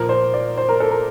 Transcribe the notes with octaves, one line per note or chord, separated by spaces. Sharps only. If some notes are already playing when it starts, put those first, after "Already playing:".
Already playing: A#2 F3 A#4
C5
D5
C5
A#4
A4
A#4